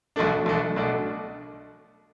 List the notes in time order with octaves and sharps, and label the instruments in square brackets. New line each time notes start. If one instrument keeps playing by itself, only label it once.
[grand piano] B1 B2 A3 D4
B1 B2 A3 D4
B1 B2 A3 D4